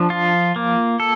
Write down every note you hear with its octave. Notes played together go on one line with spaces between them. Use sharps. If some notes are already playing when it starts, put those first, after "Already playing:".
Already playing: F3 D4
F4
A#3
A4